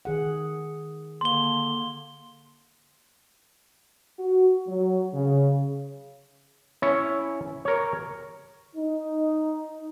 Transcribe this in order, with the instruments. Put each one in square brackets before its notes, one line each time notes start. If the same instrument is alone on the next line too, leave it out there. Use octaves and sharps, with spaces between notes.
[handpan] D#3 G#4 F#5
[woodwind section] D3 A#3 [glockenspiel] C6 G7
[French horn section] F#4
F#3
C#3
[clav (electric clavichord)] C#4 E4 C#5
A#4 C#5
[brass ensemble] D#4